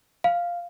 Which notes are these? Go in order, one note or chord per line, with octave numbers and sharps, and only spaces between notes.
F5